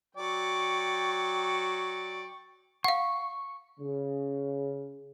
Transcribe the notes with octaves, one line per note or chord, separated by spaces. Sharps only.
F#3 D5 G5 C#6
F5 F#5 C#6
C#3